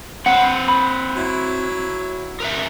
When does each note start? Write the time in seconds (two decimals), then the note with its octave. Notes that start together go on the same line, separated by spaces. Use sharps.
0.26 C4 B4 F#5
0.68 B5
1.16 F#3 E4
2.40 A#4 B4 E5